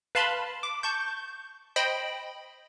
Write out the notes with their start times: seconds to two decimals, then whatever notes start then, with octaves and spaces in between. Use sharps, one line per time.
0.15 B4 F5 A5 B5 C6
0.63 D6
0.83 A5 C#6 G6
1.76 C5 D#5 G5 B5